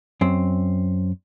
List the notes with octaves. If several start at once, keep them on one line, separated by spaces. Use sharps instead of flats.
F#2 C4